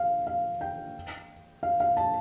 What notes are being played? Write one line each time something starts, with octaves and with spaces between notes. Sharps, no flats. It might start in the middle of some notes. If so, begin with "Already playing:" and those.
Already playing: F5
F5
G5
F5
F5
A5